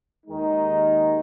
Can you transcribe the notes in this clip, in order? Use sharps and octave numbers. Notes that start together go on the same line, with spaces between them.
D#2 D#3 G#3 D#4